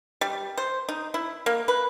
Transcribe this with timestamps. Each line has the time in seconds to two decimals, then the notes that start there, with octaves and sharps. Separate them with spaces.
0.21 G3
0.57 C5
0.89 D#4
1.14 E4
1.46 A#3
1.68 B4